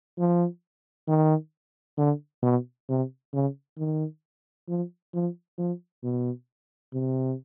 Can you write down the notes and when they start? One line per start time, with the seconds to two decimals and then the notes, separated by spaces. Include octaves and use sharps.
0.18 F3
1.08 D#3
1.98 D3
2.43 B2
2.89 C3
3.33 C#3
3.78 D#3
4.69 F3
5.14 F3
5.58 F3
6.04 B2
6.93 C3